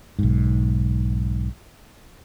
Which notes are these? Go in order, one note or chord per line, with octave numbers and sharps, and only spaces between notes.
B1 G#2